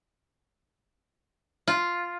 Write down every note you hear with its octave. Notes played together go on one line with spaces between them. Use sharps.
F4